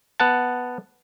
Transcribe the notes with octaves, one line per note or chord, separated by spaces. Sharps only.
B3 F#5 A5